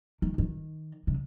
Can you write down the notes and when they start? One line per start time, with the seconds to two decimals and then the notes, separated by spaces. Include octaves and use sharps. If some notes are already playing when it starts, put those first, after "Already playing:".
0.22 D#3
0.38 D#3
1.07 C3